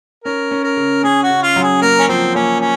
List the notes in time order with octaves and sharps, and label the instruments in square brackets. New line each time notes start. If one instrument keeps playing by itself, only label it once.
[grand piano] C#4 [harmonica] A#4
[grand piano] C#4
[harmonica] A#4
[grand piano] C#3
[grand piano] C#4 [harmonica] G#4
[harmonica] F#4
[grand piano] C#3
[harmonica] F4
[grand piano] F#3
[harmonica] G#4
[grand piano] A#3 [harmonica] A#4
[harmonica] C#4
[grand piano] F3 [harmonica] C4
[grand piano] A#3 [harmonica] C#4
[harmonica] C#4